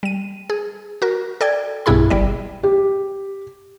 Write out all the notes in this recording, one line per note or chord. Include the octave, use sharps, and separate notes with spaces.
G3 D#7
G#4
F#4 A#4
A4 D5 G5 G#6
B1 G2 B2 E4 G#4 B5
G1 G3 D5
G4